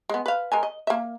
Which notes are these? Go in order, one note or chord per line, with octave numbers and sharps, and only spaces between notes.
G#3 B3
B4 F5
G#3 A#4 G#5
D#5
A#3 E5